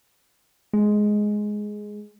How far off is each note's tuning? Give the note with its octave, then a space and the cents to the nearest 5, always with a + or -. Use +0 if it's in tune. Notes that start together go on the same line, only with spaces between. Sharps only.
G#3 +5